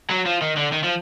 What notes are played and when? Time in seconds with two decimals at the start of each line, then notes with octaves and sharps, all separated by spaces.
0.10 F#3
0.26 F3
0.42 D#3
0.57 D3
0.73 D#3
0.84 F3